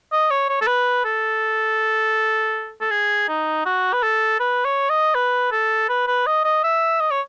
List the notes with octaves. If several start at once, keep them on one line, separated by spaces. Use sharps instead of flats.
D#5
C#5
C#5
A4
B4
A4
A4
G#4
D#4
F#4
B4
A4
B4
C#5
D#5
B4
A4
B4
B4
D#5
D#5
E5
D#5
C#5